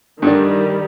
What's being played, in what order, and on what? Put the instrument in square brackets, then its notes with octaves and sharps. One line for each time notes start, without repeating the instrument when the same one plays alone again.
[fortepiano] G2 D3 D4 [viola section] D#3 G3